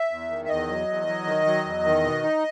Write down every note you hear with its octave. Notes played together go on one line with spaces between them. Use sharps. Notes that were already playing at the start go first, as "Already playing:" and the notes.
Already playing: E5
E2
D#3
E5
E2 D#5
F#3
E2
F#3
D#3
F#3
E2
D#3
B2
D#4